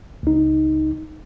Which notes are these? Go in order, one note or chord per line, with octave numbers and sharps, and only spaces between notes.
C#2 D#4